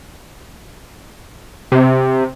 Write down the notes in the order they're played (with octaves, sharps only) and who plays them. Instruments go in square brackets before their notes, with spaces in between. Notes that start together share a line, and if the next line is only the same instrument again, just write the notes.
[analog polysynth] C3